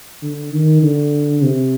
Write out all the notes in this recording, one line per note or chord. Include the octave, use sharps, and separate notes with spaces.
D3
D#3
D3
C3